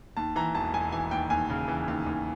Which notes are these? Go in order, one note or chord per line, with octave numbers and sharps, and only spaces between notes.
D#2 A5
E3 A#5
E1 A5
E1 G#5
E3 G#5
D#2 G5
D#2 G#5
C#3
E3
D#2
D#2